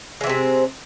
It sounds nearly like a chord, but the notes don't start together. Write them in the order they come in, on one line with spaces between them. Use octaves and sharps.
G#3 E3 C4 C3